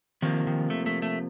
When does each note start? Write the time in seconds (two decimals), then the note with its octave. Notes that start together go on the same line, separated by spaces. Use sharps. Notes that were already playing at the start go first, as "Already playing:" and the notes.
0.22 C3 D#3 F3 A#3
0.47 D#3
0.70 A3
0.86 A3
1.02 A3